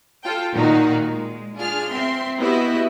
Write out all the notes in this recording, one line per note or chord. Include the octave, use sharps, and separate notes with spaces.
F4 A4 G5
A#2 D#3 A#3 D#4 F#4
G#3
D4 F4 G#4 F6
C4 E5 C6
B3 E4 F#4 G4 D#5 E5